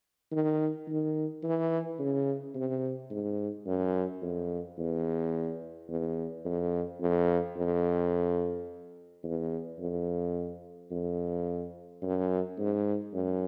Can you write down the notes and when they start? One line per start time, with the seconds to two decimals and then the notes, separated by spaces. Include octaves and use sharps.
0.32 D#3
0.88 D#3
1.43 E3
1.99 C#3
2.55 C3
3.10 G#2
3.66 F#2
4.22 F2
4.78 E2
5.89 E2
6.45 F2
7.01 F2
7.57 F2
9.24 E2
9.80 F2
10.91 F2
12.02 F#2
12.58 G#2
13.14 F#2